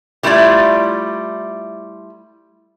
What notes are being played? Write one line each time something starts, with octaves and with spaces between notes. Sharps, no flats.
G3 A3 E4 F4 D5